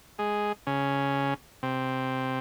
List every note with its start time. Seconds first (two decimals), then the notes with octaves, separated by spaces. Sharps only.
0.19 G#3 G#4
0.67 C#3 C#4
1.63 C3 C4